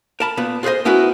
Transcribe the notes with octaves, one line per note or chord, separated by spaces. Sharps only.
A#4 A5 B5
A#2 B3 B4
F4 G#4 B4 C5 D#5
B3 C#4 E4 F#4 A#4 B4